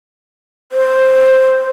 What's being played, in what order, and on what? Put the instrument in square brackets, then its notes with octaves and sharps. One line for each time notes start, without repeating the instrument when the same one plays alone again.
[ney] C5